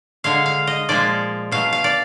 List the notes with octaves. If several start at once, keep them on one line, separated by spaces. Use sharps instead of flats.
D3 G#3 F5
F5
D#5
A#2 F3 G#3 D5
B2 F#3 F5
F5
D5